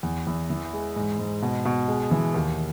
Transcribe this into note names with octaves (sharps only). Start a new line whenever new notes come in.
E2
E2
E3
G#3
G#2
G#2
B2
B2
G#3
E3
D#2